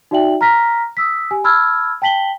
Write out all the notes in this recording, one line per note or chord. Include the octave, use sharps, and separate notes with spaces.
D#4 F#4 D5 E5 G5 F#7
A#5 F6 A#6 B6
D#6 E6 B6
G4 G#5
A5 B5 E6 F6 G#6
G5 A5 B6 F#7 G7